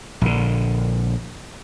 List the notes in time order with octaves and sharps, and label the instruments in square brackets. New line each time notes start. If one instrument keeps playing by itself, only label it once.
[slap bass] A#1 D3